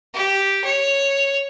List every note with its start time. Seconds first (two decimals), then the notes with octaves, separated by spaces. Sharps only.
0.14 G4
0.64 C#5